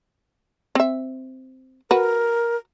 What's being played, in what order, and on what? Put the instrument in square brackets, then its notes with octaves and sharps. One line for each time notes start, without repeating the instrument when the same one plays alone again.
[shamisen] C4 E5
[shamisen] F#4 B4 [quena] A#4